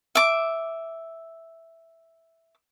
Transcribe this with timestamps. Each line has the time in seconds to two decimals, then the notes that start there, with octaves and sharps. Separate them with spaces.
0.15 E5 D6